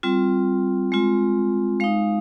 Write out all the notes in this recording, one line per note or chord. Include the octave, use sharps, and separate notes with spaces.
G3 C4 F4
G#3 C4 F4
G#3 D#4 F5